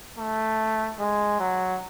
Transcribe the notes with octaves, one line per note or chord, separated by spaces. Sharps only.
A3
G#3
F#3